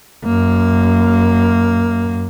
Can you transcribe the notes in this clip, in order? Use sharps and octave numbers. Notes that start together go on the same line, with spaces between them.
F#2 A#3